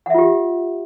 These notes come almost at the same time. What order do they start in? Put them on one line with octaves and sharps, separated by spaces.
F#5 E5 F4 G4